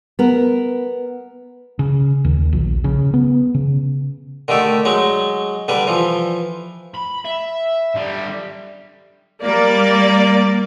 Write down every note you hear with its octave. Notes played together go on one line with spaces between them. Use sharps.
B3 A#4
C#3
D#2
A#1
C#3
B3
C#3
D3 D#3 A3 G4 A4
F#3 G#3 D#4
D3 G3 B4
E3 F3
B5
E5
D3 G3
G3 A#3 D5